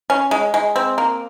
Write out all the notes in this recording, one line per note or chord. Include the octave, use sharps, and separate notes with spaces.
C#4
G#3
G#3
C4
A#3